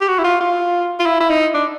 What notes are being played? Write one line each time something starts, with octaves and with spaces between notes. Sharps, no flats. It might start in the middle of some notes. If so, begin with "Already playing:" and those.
G4
F#4
E4
F4
F4
F4
E4
E4
D#4
D4